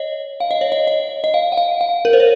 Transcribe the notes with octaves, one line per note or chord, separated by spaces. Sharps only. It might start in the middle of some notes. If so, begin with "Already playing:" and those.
Already playing: C#5 D#5
F5
D#5
C#5
D#5
D#5
D#5
F5
F#5
F5
F5
A#4
C5
C#5